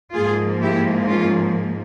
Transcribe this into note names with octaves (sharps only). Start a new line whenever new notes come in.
G#2 F3 A#3 F4 G#4
E4 G4
C#4 F4